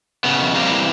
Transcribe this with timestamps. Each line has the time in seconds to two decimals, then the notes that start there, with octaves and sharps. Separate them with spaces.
0.24 C#3 B3
0.40 F2
0.55 G3 A#3 C4
0.70 E3